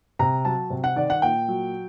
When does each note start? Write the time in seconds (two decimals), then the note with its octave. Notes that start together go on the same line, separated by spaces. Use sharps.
0.19 C3 A#5
0.45 F#3 A5
0.70 C3
0.84 F#5
0.96 D#3 D5
1.10 F#5
1.22 A#2 G5
1.48 F#3